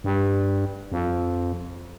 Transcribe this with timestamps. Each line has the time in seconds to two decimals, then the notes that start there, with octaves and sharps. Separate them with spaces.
0.04 G2
0.92 F2